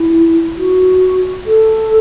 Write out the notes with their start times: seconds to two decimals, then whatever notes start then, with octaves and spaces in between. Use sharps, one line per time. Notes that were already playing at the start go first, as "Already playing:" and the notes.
Already playing: E4
0.57 F#4
1.46 A4